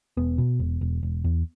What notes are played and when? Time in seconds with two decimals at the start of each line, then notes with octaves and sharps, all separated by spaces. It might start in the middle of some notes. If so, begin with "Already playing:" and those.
0.17 E1 B3
0.38 B2
0.60 E1
0.81 E1
1.03 E1
1.24 E2